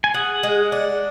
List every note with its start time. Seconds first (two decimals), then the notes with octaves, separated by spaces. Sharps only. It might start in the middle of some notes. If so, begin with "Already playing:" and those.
0.04 G#5
0.14 G#4 F#5
0.43 G#3
0.72 D4